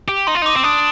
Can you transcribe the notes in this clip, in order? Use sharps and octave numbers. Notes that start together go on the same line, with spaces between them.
G4
D#4 C6
F4
D#4 D6
C4
D4 D#6